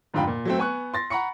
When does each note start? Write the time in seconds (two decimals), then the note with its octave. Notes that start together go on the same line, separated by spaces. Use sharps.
0.14 F2 G#2 D3 F4 G5 B5
0.27 A#2
0.45 F#3 A3 C4
0.58 B3 G#5 C#6 F#6
0.94 C6 A6 A#6
1.10 F#5 A#5 B5 C#6 C#7